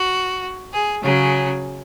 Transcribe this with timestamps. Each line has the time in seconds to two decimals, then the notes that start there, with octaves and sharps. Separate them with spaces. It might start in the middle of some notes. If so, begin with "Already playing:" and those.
Already playing: F#4
0.70 G#4
1.02 C#3 F#3 C#4 G#4